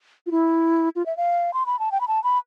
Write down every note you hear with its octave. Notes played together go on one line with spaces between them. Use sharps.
F4
E4
F4
E5
F5
C6
B5
A5
G5
B5
A5
B5